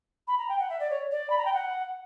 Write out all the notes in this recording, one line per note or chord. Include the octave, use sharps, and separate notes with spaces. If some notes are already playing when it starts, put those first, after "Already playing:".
B5
A#5
G5
F#5
E5
D5
C#5
D5
B5
A#5
G5
F#5